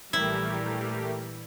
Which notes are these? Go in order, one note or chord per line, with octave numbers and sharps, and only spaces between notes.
A#1 E3 G3 A3 E4 G4 A#4